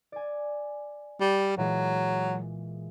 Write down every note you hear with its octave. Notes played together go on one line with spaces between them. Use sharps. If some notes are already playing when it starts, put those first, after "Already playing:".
D5 G#5
G3
A#2 E3 F#3 G#3